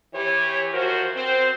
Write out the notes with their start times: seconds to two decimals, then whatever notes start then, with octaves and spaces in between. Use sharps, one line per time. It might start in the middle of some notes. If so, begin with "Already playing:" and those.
0.14 E3 G4 C#5
0.73 F3 F#4 A#4 C5
1.15 C4 C5